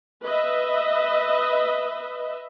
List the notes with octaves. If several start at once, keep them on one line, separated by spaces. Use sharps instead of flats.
B4 D#5 E5